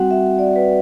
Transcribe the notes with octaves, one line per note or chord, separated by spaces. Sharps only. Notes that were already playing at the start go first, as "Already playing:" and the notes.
Already playing: G3 C4 F#4 F#5
E5
D5
B4